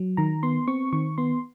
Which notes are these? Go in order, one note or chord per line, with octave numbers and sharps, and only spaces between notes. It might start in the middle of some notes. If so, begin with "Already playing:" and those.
Already playing: F#3
D#3 A#5
B3 C6
C4 C#6
D#3 C#6
B3 C6